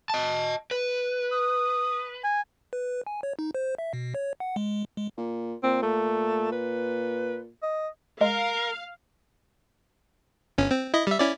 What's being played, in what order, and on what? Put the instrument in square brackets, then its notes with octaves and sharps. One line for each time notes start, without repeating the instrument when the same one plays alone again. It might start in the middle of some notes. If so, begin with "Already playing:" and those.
[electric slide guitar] D#5 A5
B4
[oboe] D#6
G#5
[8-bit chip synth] B4
G#5
C#5
D#4
C5
E5
B2
C#5
F#5
G#3
G#3
[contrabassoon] A#2
[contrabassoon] A#2 [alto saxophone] C4
[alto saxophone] A3
B4
D#5
[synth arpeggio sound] G#3 [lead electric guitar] A#4 [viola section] F5
[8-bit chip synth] G1 C#4
C4
E4 D#5
G3 E5
C#4 E4 D5